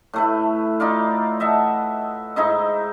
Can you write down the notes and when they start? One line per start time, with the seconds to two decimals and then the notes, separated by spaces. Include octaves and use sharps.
0.13 A2 A3 B4
0.80 D#4 F4 D5 F5
1.40 D#5 E5 F#5 A5
2.36 G#2 D#4 E4 D#5